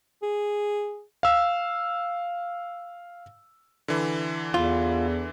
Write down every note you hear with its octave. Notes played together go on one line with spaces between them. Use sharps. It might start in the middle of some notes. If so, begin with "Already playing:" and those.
G#4
F5 E6
D3 E3
E2 F4